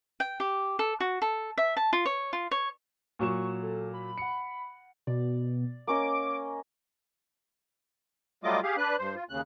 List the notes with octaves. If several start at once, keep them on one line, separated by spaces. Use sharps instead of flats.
G5
G4
A4
F#4
A4
E5
A5
F4
C#5
F4
C#5
A#2 F#3 C#6 E7
A4
B5
F#5 C#7
B2 D5
A#3 C#4 D#5 D6
F#3 G3 A3 F4 D#5 D6
G4 G#4 F5
D4 B4 F#6
G2 C5
F4
D#2 C#3 F#6